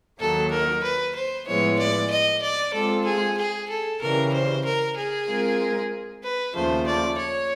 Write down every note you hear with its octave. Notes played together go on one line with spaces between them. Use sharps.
D#2 D#3 F#3 A#3 D#4 A4
A#4
B4
C5
A2 F3 G#3 B3 E4 C#5
D5
D#5
D5
G#3 C4 F4 A4
G#4
G#4
A4
C#3 E3 G3 A#4
C5
A#4
G#4
G#3 C4 F4 A#4
B4
D#2 C#3 F3 A3 C5
D5
C#5